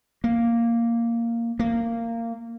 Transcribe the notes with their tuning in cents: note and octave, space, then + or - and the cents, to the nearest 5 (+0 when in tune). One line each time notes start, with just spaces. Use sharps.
A#3 -5
A#3 -15